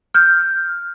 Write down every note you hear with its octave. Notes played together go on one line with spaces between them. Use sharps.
F6 G6